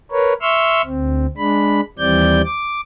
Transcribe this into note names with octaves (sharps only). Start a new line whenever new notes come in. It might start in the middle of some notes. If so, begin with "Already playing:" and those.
A#4 B4 C#5
E5 C6 C#6 E6 F6
D2 C4
G#3 D4 B5
D#2 E3 G3 C4 D5 G6
D6